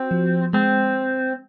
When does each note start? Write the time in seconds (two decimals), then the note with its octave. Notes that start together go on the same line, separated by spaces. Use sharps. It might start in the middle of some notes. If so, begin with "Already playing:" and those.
Already playing: C4 F#4
0.11 F3
0.53 G#3 C4